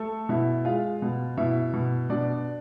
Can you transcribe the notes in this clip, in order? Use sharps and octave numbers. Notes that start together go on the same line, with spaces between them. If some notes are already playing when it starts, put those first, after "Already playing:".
Already playing: A3 A4
B2 E4 E5
G#3 F4 F5
B2
B2 E4 E5
B2
B2 D4 D5